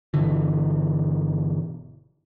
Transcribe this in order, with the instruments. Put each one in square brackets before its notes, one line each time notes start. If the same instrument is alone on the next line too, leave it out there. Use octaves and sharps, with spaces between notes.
[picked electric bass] G1 B2 D3 E3